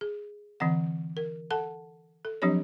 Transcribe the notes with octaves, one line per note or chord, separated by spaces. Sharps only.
G#4
D3 E3 C4 F#5
A#4
A4 F#5 A5
A4
F3 F#3 C4 D4 G4 C#5